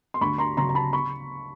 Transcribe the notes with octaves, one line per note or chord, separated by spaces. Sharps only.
C6
D2 B5 C#6
A#5 C6
C#3 F#3 A#5 C6
A#5
A5 B5
B5 C#6